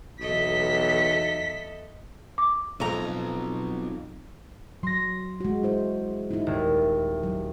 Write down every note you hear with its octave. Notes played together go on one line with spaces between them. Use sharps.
B1 E2 A4 D#5 B6
D6
B1 F2 A#5
F#3 C6 A#6
G#3 F#4
E4 C5
D#4 E4
D#1
F#3